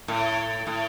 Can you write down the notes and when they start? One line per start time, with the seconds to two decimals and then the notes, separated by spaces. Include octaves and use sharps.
0.08 A2
0.67 A2